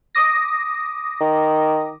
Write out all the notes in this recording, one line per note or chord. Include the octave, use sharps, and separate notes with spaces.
D6 D#6 A#6
D#3